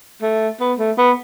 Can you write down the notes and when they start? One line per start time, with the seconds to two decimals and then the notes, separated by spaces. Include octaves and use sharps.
0.22 A3
0.60 B3
0.79 A3
0.98 B3